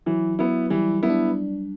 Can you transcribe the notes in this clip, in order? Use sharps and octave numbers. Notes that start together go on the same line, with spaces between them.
E3 F#3
F#3 B3 E4
E3 G3
B3 E4
D4